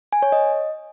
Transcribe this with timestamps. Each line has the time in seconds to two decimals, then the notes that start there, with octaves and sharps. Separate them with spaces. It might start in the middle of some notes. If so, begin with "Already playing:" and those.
0.13 G#5
0.22 C#5
0.32 D#5